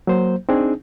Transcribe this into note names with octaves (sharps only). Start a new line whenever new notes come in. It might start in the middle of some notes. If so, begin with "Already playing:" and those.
F#3 A#3 C5
C4 D4 D#4 G#4